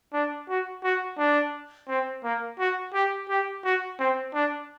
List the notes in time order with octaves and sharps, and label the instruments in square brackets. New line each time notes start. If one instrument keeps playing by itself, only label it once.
[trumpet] D4
F#4
F#4
D4
C4
A#3
F#4
G4
G4
F#4
C4
D4